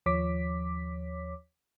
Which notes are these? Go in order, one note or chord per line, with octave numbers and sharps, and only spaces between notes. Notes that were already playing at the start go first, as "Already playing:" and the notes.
D#2 F3 C#5 D6 B6